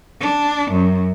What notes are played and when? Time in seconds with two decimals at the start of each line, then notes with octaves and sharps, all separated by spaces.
0.21 D4
0.72 F#2